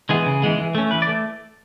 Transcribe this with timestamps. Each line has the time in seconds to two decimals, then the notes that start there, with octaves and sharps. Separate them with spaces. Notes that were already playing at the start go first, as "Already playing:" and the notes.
0.09 E3 G#3 B3 G#4
0.26 C#3
0.42 E3 G#3 B3
0.58 E3
0.75 A3 C#4
0.91 E3 B4
1.02 D5
1.08 A3